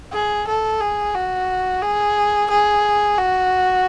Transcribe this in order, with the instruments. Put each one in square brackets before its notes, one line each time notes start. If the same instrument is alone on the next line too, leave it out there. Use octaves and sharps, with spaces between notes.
[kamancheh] G#4
A4
G#4
F#4
G#4
G#4
F#4